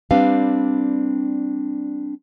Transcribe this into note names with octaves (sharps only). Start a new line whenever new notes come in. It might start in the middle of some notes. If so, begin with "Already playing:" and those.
G3 C4 D4 B4 F5